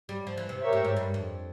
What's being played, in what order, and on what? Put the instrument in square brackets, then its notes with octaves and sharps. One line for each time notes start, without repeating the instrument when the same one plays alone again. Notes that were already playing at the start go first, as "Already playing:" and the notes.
[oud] G3
F3
E3
C3
[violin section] G4 A#4 C#5 E5
[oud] A2
G#2
G2
F2